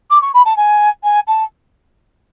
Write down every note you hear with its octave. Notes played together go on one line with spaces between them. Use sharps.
D6
C#6
B5
A5
G#5
G#5
A5